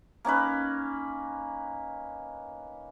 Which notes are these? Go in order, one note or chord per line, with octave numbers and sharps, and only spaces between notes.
A#3 C#4 D#4 B4